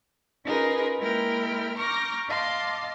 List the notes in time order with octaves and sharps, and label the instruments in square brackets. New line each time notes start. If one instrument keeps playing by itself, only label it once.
[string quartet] C#4 D#4 F4 G#4 A#4 B4
G#3 A#3 E4 A#4 G5 F6
A#5 C#6 D6 F6 G6 A#6
D#5 F5 A5 C6 D6